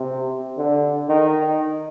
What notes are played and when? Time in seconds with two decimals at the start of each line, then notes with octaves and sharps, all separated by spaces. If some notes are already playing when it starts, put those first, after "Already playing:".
Already playing: C3
0.57 D3
1.09 D#3